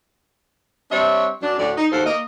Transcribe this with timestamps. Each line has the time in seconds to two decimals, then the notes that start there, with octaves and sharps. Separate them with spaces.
0.91 G3 C4 D4 C#5 E5
1.42 F#2 F#3 D4
1.58 D2 A2 D3 D5
1.76 D#4
1.91 D#2 F#4 A4 C5 F5
2.06 A#3 D#5